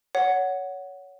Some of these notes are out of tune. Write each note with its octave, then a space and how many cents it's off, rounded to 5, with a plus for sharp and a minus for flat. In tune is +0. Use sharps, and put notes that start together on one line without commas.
C#5 +20 F#5 +0